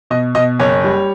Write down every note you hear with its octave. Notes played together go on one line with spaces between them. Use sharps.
B2 D#5
B2 D#5
F#1 C#5
G3